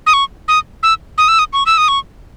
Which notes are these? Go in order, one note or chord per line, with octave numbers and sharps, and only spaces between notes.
D#6
C#6
D#6
E6
D#6
E6
D#6
C#6
E6
D#6
C#6